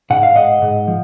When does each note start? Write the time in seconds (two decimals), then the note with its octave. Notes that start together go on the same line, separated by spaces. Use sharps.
0.10 G#2 F#5
0.23 F5
0.35 G#2 D#5 F#5
0.62 G#2
0.88 F3